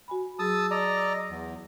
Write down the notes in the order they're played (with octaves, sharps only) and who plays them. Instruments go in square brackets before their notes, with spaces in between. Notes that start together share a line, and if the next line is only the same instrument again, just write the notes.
[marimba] F#4 G#5 B5
[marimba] F#3 G#4 [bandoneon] A5 D#6 E6
[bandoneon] D5 D#5 A#5
[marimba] E6
[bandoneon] E2